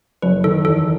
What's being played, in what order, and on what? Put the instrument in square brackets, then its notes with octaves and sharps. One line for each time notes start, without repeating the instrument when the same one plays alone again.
[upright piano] F#1 [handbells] B4
[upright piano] D#3 [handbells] A4
[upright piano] E2 [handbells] A4